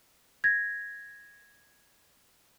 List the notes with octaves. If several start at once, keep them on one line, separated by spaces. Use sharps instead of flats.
G#6 A#6